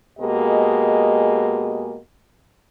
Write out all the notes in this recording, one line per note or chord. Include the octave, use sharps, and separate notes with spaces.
B2 G#3 A#3 G4 G#4 D#5